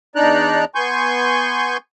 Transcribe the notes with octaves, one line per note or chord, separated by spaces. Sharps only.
E2 D4 D#4 D5 A#5 F#6
B3 G#5 C6 C#6 G6